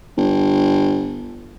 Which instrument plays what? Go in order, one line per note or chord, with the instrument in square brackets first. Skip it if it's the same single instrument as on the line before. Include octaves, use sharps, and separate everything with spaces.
[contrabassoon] G1